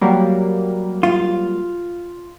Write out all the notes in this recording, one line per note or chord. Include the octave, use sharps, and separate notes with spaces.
F#3 G3 A#3
F4